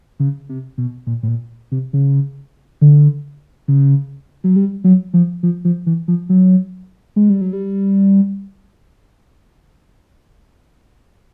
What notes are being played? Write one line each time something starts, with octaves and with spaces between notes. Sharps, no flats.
C#3
C3
B2
A#2
A2
A#2
C3
C#3
D3
C#3
F#3
G3
F#3
F3
F3
F3
E3
F3
F#3
G#3
G3
F#3
G3